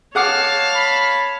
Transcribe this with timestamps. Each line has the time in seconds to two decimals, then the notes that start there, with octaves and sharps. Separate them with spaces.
0.15 G#4 C#5 F5 F#5 A5 D6
0.75 B5